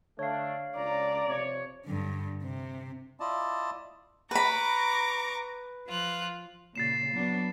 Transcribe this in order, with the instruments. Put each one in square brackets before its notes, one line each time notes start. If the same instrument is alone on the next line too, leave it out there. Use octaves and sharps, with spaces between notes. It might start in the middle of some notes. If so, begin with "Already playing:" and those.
[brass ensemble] D3 A3 D4 [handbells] C#5 F5
[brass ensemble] C#2 D4 A#5 [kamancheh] D5
[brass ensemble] C3 F3 C#5
[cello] G2 D3
C3
[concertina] E4 F4 D5 D#5 A5
[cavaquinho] B4 B5 [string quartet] A#5 C#6 D6
[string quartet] F3 F4 F#6
[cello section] A#2 C#3 [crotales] A6 C7 E7
[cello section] F#3 B3 D4